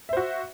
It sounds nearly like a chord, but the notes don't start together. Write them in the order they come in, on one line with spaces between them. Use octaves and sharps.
E5 C5 F#4